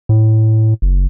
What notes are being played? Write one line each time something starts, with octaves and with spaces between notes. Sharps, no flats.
A2
F#1